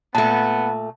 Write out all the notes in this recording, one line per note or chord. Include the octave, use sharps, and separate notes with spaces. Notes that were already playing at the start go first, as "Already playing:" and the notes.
A#2 A3 B3 A5